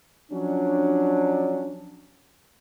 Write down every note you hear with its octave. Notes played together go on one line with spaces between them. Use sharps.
F3 F#3 C#4 D4